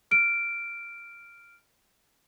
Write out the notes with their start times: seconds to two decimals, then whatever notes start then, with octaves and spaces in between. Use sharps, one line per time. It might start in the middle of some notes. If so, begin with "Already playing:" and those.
0.11 F6 D7